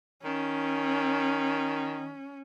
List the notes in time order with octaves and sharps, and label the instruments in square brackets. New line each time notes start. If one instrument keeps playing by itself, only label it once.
[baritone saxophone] D#3 [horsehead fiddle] C#4